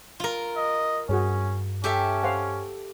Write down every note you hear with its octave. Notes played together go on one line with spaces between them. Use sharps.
F4 A#4
D#5
G2 C#4 F#4 G#4 C#5
C#4 G4 A4 E5
C5 F5 F#5